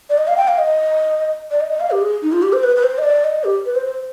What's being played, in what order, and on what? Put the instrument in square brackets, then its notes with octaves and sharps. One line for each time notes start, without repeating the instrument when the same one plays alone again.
[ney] D5
D#5
F5
G5
F5
D#5
D5
D#5
D#5
F5
G4
G#4
D#4
F4
G4
C5
B4
B4
C5
D#5
D5
D#5
G4
B4
C5
C5